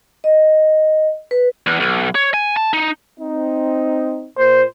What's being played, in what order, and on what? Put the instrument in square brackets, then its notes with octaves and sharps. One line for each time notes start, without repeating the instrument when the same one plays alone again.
[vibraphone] D#5
B4
[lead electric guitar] E2
B1
C#5
G#5
A5
D#4
[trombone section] C4 D#4
[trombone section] A#2 [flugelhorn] C5